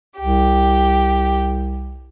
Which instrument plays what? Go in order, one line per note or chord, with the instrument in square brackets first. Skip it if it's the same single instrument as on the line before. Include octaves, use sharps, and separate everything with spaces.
[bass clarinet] C2 [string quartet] G4